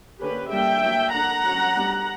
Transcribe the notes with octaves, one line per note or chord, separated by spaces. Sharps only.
D3 A#3 C#4 G4 B4
G3 A#3 D4 E5 G5
F#3 A#3 D4
D3 A#3 D4 F#5 A#5
F#3 C#4
G3 B3 D4